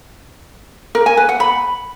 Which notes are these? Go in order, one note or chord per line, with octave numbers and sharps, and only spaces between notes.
A#4
G#5
B4
F#5
B5